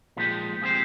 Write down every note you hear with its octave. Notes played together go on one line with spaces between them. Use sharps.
A#2 F3 G#3 D#4 G4
F3 G#3 C4 G4 C5